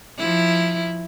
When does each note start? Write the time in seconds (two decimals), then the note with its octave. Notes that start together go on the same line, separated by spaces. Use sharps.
0.18 F3 E4